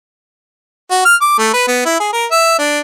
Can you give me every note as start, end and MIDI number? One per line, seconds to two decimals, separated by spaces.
0.91 1.04 66
1.05 1.16 89
1.22 1.35 86
1.39 1.50 57
1.53 1.66 71
1.68 1.85 59
1.86 1.99 64
2.00 2.10 68
2.13 2.26 70
2.31 2.56 76
2.59 2.80 62